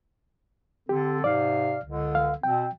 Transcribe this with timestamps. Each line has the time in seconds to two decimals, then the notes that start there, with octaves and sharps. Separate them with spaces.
0.89 D3 C4 G4 A4
1.24 G#2 C3 D5 F5
1.85 C#2 D3
2.15 F5
2.43 B2 C4 G5